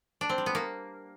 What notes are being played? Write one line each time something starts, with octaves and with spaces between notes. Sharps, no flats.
D4
C4
G3
B3
A#3